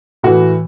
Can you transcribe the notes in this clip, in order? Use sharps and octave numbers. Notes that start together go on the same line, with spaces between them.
A2 E3 F#4